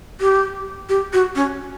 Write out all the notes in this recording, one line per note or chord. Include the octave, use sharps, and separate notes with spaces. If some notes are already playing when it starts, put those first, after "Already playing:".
G4
G4
F#4
C#4